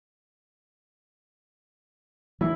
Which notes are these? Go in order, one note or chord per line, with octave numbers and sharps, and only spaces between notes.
E3 E4